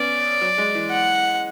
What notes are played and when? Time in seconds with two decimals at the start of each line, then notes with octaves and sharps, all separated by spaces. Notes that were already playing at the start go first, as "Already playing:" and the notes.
Already playing: B3 C#4 D5
0.41 F#3
0.58 G#3
0.75 E3
0.91 F#5